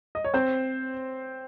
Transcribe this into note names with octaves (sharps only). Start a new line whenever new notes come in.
D#5
C#5
C4 C5